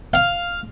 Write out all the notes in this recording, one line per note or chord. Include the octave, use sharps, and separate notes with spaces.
F5